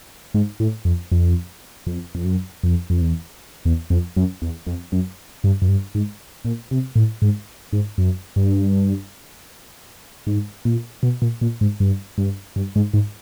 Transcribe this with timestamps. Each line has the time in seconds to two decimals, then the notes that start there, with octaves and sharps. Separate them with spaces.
0.34 G#2
0.60 A2
0.85 F2
1.11 F2
1.87 F2
2.15 F2
2.25 F#2
2.63 F2
2.90 F2
3.02 E2
3.65 E2
3.90 F2
4.17 F#2
4.42 E2
4.67 F2
4.92 F#2
5.44 G2
5.62 F#2
5.69 G2
5.95 G#2
6.45 A#2
6.71 C3
6.96 A2
7.22 G#2
7.73 G#2
7.98 F#2
8.36 G2
10.27 G#2
10.65 A#2
11.03 B2
11.22 A#2
11.41 A#2
11.61 G#2
11.80 G2
12.18 G2
12.56 G2
12.76 G#2
12.94 G#2